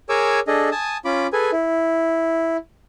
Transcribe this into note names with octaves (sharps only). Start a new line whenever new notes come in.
G#4 A#4 C#5 G#5 D6 E6
D4 G#4 A4 D#5
G#5 A5 D#6
C#4 F4 B5 D6
G#4 A4 B4 G#5
E4